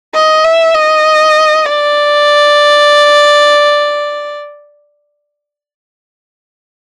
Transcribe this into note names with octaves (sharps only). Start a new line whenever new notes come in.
D#5
E5
D#5
D5